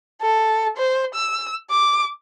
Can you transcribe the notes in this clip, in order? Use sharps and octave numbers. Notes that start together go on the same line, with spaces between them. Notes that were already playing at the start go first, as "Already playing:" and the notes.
A4
C5
E6
D6